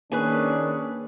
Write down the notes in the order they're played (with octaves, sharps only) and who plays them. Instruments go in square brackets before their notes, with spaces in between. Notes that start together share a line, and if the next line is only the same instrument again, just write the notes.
[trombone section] D#3 C#4 D4 [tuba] A#3 [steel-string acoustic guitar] G#4 B4